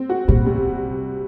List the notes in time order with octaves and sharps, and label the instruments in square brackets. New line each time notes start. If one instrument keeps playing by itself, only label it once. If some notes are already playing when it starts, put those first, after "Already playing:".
Already playing: [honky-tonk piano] C4
F#4
[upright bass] A#2 [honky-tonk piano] G3
[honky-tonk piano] C3